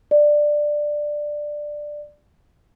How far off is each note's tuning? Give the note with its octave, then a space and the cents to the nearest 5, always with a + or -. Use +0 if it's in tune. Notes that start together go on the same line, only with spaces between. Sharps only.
D5 +10